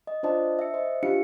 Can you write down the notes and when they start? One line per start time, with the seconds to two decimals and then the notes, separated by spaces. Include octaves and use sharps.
0.07 D#5
0.23 D4 F4 C5 D5 D#5 A5
0.59 E5 C#7
0.74 C5 D#5
1.03 D4 F4 G4 F5 C#7